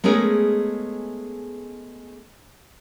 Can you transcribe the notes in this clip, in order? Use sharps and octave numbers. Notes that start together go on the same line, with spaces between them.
G#3 A3 B3 C#4 G#4 A#4